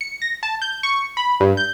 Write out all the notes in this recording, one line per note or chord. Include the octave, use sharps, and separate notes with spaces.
C#7
A#6
A5
G6
C#6
B5
G2
G6